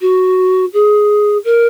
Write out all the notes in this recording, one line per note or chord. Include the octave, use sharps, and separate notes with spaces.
F#4
G#4
A#4